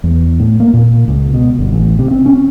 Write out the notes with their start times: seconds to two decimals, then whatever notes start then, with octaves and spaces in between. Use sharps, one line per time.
0.04 E2
0.40 A2
0.60 A#3
0.74 A#2
1.08 C#2
1.34 B2
1.59 G1
1.72 A1
1.99 C3
2.11 C4
2.26 C#4